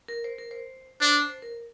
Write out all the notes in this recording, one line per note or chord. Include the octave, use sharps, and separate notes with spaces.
A#4
C5
A#4
C5
D4 C5
C5
A#4